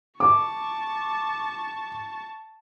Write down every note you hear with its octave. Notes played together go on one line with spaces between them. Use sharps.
A5 C#6 D6